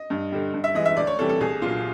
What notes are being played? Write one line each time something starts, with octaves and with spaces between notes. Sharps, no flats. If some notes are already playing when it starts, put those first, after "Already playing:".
Already playing: D#5
G2
D3 G3
G2
E5
E3 G#3 D#5
E5
D2 D5
C#5
C3 E3 G3 A4
A4
C2 G#4
A#2 F#3 F4